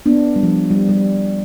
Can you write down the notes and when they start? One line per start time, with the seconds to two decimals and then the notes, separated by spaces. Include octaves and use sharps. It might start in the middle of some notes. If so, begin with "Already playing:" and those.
0.06 B3 D4
0.36 G3
0.43 F3
0.71 G3
0.89 G3